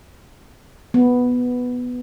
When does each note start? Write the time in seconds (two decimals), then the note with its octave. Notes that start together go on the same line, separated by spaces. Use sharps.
0.94 B3